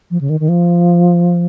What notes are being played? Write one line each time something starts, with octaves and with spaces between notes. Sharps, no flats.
F3
C#3
D#3
D#3
F3